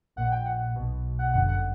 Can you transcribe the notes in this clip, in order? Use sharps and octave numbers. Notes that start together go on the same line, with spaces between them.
A#1 A#2 F#5
G5
F#5
B1 B2
F#5
G1 F#2 D3 F#5
F#5